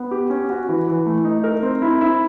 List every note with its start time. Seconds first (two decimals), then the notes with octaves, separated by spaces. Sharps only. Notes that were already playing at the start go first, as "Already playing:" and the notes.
Already playing: B3
0.11 G4
0.30 C#4
0.50 F#4
0.69 E3
0.88 E3
1.06 A3
1.25 D#4
1.44 A#4
1.63 C4
1.82 E4
2.01 E4